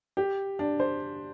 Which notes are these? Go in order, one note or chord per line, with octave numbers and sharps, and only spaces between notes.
G4
D4
C5